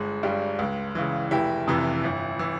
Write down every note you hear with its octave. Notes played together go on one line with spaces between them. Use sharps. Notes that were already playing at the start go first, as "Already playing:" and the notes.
Already playing: G1 G#3
G2 G3
C#2
C#3 E3
F1 E4 G4
F2 C3 E3
G1
E3